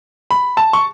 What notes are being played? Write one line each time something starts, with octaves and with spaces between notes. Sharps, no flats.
B5
A5
C#6